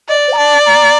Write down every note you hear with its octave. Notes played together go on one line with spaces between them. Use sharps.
D5 D#5
C5
A#5
D5 A5
A#5